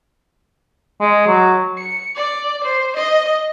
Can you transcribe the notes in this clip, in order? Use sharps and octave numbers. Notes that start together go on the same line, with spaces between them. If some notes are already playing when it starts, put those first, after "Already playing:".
G#3
F#3
C#7
D5
C5
D#5